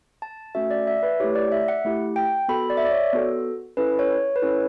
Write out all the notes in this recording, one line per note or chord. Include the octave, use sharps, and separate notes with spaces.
A5
A3 C#4 F#4 A4 E5
D5
E5
B4
A3 E4 G4 C#5
D5
E5
F#5
A3 E4 G4
G5
B3 F#4 A4 B5
D5
E5
D5
C#5
B3 F#4 A4
C#4 E4 A4 B4
C#5
B4
C#4 E4 A4 C#5